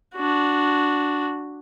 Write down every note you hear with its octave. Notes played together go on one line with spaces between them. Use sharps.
D4 F#4